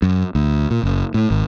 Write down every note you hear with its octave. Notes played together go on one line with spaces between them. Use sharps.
F#2
D2
A#2
F#1
A2
G#1